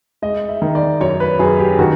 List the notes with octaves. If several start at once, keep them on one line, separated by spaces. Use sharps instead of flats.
G#3 D#5
E5
D#3
D5
F#2 C#5
B4
F#2 G#4
G4
D#3 F#4